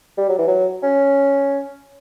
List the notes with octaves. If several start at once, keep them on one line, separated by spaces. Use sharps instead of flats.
G3
F#3
E3
F#3
C#4